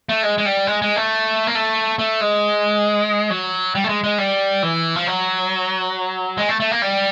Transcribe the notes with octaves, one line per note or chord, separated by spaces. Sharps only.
A3
G#3
G#3
G3
G#3
G#3
A3
A#3
A3
A3
G#3
F#3
G3
A3
G#3
G#3
G3
E3
F3
F#3
G#3
A3
A3
A#3
G3